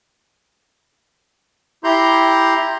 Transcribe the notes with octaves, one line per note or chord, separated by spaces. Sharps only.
E4 G4 A#5 C6 G6